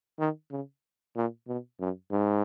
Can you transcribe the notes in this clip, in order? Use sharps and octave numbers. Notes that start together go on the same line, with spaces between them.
D#3
C#3
A#2
B2
F#2
G#2